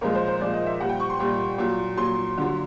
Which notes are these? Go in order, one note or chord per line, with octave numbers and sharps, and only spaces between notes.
A#2 F3 G#3 A#4
C5
C5
A#2 F3 G#3 D5
D#5
E5
A#2 G3 F#5
G5
C#6
C6
A#2 G3
A#2 F#3
A#2 F#3 C6
D3 F#3